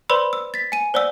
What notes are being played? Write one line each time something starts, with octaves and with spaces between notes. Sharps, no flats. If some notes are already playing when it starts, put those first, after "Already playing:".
B4 C5 D5 B5 C6 E6
E6
A6 B6
G#5 D#7
C5 D5 F#5 E6